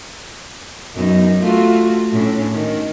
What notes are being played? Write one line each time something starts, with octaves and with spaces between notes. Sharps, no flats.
F#2 B3 D#4
A3 F4 F#4
A2 C#4 D4
D#3